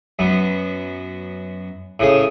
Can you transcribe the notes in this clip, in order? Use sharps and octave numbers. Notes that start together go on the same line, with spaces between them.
F#2 B3
A2 C#3 G#4